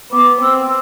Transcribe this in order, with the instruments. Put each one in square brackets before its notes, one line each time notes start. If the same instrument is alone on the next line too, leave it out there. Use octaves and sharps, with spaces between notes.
[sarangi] B3 [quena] D6
[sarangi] C4 [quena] E6